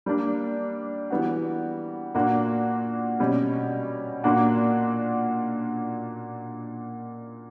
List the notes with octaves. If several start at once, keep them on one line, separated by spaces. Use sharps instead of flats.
G3 A#3 D4
E3 G3 B3 F#4
A#2 A#3 D4 F#4
B2 G3 C#4
A#2 A#3 D4 F#4